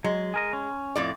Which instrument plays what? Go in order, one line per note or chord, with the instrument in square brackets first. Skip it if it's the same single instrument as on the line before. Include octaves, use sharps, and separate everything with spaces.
[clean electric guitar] F#3 [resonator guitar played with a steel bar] G#3
[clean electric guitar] G#4 A#4 D#5
C#4
[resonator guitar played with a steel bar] F2 A2 D5